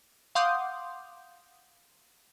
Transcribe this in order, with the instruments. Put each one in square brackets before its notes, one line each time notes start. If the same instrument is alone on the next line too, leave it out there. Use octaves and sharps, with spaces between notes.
[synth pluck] F5 F#5 C6 D6 D#6 G6